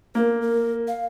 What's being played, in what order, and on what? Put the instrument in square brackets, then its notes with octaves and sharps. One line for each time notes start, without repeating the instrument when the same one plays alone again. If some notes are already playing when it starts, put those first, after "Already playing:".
[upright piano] A#3 [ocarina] A#4
[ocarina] A#4
F5